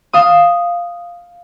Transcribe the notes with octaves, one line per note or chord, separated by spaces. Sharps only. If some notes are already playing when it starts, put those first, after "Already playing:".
F5 D#6